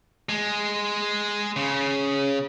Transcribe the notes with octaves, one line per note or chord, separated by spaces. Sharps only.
G#3
C#3